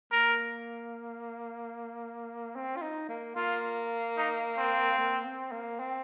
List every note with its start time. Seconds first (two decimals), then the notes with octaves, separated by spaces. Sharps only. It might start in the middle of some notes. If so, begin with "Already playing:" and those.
0.12 A#3 A#4
2.56 C4
2.76 F4
2.82 D#4
3.09 A#3
3.36 A#3 F4
4.17 D#4
4.58 C4
4.98 A#3
5.25 C4
5.52 A#3
5.79 C4